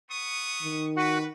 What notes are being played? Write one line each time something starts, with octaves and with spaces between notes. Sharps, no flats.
B3 C#6 D#6
D#3
F#4 B4 F#5